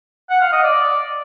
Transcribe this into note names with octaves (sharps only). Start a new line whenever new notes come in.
F#5
F5
D#5
D5